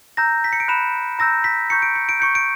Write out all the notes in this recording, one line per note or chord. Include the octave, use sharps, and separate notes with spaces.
A#5 E6 G6 A#6
B6
C#7
D7
B5 F#6 E7
A#5 E6 G6 A#6
B6
A#5 C#6 G6 C#7
D7
C#7
D7
C#6 G6 C#7
D7